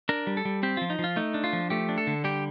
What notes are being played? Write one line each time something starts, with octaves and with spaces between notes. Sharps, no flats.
D4 A#4
G3
A4
G3
C4 G4
F3 F4
D#4
F3
F4
A3 D#4
D4
F4
F3
A3 G4
D4
A4
D3
G3 G4